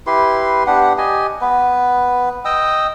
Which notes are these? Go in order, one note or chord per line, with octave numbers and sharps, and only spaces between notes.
E4 G4 B4 C6
B3 D4 G4 F#5
G4 D#5 G#5
B3 B4
D#5 G5 D#6 E6